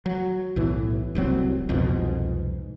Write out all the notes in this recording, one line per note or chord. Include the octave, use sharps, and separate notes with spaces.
F#3
B1 A2 E3
D1 C2 F#3 C4
C2 F2 G#2 B2